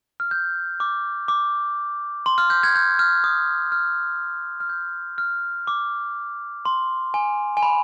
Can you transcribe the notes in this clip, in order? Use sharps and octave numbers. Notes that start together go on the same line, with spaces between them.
F6
G6
D6
D6
C6
F6
G6
G#6
G6
F6
D#6
F6
F6
G6
F6
D6
C6
G#5
G#5
B5